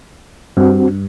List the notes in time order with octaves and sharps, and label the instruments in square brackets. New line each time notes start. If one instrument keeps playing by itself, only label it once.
[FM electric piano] G2 [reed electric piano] C4 F#4